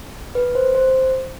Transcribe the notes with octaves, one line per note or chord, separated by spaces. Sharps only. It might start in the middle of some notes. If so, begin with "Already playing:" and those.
B4
C5
C5